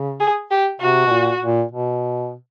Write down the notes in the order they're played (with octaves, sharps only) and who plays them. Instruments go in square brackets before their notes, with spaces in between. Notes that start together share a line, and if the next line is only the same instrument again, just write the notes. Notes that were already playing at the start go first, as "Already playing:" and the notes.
Already playing: [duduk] C#3
[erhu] G#4
G4
[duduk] C3 [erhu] F#4
[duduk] B2
A#2
A#2
B2